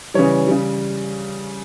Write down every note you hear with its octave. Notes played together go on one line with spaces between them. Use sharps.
C#3 E3 G3 C#5
C#3 G3